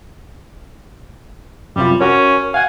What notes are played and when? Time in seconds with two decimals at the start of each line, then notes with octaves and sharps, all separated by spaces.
1.76 F#2 C3 G3 F4
2.01 C#4 F#4 A#4 C#5
2.54 F5 F#5 G#5